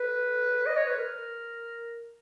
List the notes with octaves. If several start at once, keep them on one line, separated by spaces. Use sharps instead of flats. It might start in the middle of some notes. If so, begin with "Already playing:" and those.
Already playing: B4
D#5
C#5
B4
A#4